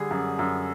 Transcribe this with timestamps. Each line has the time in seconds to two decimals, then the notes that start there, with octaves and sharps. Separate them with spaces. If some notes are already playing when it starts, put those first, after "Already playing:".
Already playing: D3 G3 G#4
0.11 F#2
0.39 F#2